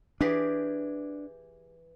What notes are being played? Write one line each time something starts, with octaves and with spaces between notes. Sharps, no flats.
E3 D4 G4 G#4